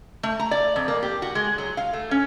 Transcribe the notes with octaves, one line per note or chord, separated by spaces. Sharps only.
A3
A#5
D5
F2
A#3
G4
F#4
G#3
F#3
F5
A3
C#4